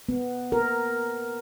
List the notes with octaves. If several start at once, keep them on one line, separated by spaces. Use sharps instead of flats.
B3
A#4